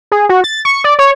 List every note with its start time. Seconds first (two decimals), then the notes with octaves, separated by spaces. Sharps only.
0.12 G#4
0.29 F#4
0.44 A6
0.65 C#6
0.84 D5
0.99 C#5